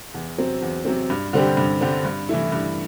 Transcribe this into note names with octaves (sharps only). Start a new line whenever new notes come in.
E2
C3 F#3 C4
E2
C3 F#3 C4
G2
D3 G3 C4 G4
G2
D3 G3 C4 G4
G2
E3 A3 E4
G2